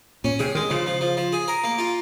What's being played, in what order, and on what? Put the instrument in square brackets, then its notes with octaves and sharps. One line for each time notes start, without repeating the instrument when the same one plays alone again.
[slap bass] A#2 [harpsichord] C#4
[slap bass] C3 [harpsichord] G#4
[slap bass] D#3 [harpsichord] G#3
[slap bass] C#3 [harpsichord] F3
[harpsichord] F3
F3
F3
G#4
A#4
A#3
F4